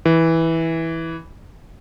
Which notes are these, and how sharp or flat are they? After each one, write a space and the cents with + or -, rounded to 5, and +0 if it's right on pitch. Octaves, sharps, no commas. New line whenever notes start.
E3 -10